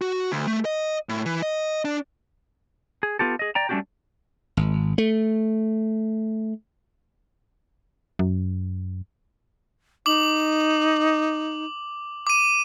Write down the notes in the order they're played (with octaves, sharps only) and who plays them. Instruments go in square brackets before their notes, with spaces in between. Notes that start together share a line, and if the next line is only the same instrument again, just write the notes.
[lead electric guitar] F#4
D2
A3
D#5
A2
E3
D#5
D4
[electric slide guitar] G#4
B3 F4 G4 A4
G#4 D#5
D5 G5 A#5
G3 A3 C#4 D4 F#4 G4
[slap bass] G#1
A3
[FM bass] F#2
[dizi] D#4 [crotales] D6 F#7
[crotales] D6 D#7